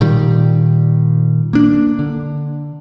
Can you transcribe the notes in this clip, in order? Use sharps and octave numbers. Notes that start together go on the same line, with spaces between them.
A#2 D#3 G3
A#3 D4
D3